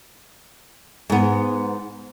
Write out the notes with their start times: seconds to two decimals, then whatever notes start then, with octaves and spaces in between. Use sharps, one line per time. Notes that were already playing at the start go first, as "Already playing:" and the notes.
1.10 G#2 B3